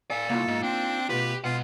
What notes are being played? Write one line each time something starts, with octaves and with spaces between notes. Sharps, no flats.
A4 D5 F5 G#5
C2 A#3 D#4 F4
G#2
C4 D4
B2 A3 F4 G4 B4
B2 G#3 F4 F#5